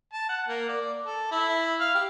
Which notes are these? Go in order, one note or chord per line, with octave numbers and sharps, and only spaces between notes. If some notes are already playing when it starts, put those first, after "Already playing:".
A5
F#5
A#3
D5
A4
E4
F5
G4